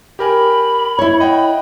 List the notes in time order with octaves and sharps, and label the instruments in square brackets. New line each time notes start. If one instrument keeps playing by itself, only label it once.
[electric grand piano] G4 A#4 G#5 [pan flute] B5
[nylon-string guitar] E4 C#5
[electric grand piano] D#5 F#5 G5